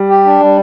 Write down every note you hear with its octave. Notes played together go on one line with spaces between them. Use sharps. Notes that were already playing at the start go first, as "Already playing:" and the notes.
Already playing: G3
G4
D4
G3